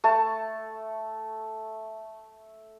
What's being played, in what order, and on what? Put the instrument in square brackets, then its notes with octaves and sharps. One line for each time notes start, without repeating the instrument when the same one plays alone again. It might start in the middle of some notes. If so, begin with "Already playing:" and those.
[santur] A3 A5